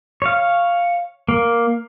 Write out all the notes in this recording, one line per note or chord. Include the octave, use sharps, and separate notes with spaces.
C#5 F5
A#3